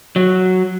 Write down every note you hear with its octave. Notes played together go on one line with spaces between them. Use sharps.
F#3